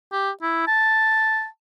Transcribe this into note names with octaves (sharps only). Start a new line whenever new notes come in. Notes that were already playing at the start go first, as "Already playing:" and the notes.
G4
E4
A5